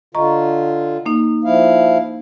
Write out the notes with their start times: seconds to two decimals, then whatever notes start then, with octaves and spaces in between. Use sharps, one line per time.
0.15 D3 F4 D#5 A#5 C#6
1.06 A#3 D#4
1.44 F3 E4 F5